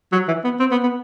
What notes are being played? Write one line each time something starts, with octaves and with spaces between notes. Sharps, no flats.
F#3
E3
B3
C4
B3
B3